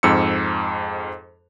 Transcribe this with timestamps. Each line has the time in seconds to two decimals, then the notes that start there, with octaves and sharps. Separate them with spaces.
0.03 F2 G#2 E6 C#7